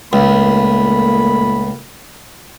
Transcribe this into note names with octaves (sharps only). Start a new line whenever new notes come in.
C#2 A#2 A3 A#3 B5